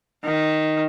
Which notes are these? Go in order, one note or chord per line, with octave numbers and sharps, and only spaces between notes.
D#3